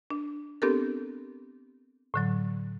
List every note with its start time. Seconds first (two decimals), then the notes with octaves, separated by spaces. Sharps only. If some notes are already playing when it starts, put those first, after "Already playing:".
0.11 D4
0.62 B3 C4 D4 G4 A4 A#4
2.14 A2 D3 F#3